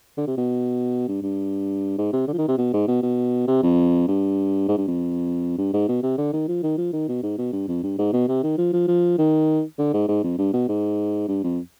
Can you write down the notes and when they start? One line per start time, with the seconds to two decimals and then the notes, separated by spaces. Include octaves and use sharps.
0.18 D3
0.27 C3
0.37 B2
1.08 G2
1.22 G2
1.98 G#2
2.13 C3
2.28 D3
2.33 F3
2.38 D#3
2.48 C3
2.58 B2
2.73 G#2
2.88 B2
3.02 B2
3.48 C3
3.63 F2
4.08 G2
4.68 G#2
4.78 G2
4.88 F2
5.58 G2
5.73 G#2
5.88 B2
6.03 C3
6.18 D3
6.33 D#3
6.48 F3
6.63 D#3
6.78 F3
6.93 D#3
7.08 B2
7.23 G#2
7.38 B2
7.53 G2
7.68 F2
7.83 G2
7.98 G#2
8.13 B2
8.28 C3
8.43 D#3
8.58 F3
8.73 F3
8.88 F3
9.18 D#3
9.79 D3
9.93 G#2
10.08 G#2
10.23 F2
10.38 G2
10.53 B2
10.68 G#2
11.28 G2
11.44 F2